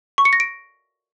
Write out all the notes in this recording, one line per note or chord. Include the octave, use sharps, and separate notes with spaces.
C#6
C#7
A#6
D7